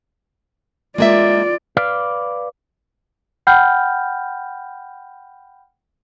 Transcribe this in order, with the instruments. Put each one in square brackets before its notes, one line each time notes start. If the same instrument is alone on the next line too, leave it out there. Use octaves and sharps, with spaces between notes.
[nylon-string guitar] G#3 A#3 E5 [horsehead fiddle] F4 D5
[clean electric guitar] B4 D5 F5
[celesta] F#5 G5 B5 F6 G6